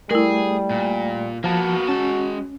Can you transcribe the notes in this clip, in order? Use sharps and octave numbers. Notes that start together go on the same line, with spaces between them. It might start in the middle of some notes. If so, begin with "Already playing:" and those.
G3 A3 E4 G#4 A#4
A#2
F3 A#3 B3 F#4 A5
G#3 C#4 A5